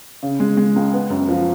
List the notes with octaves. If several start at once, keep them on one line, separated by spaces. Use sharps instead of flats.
C#3
G#3
G#3
C#2
B3
F#2
F3